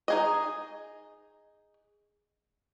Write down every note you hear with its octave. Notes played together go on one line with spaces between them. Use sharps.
D#4 G#4 D#5